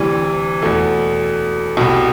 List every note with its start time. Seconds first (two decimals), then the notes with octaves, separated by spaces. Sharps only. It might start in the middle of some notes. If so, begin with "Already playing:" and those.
Already playing: D2 C3 E3 G3
0.62 E2 B2 A3
1.77 C2 B2